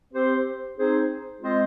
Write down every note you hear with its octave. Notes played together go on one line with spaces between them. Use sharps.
C4 G4 C5
C4 D#4 G#4 C5
G#3 C4 F4 C5 D#5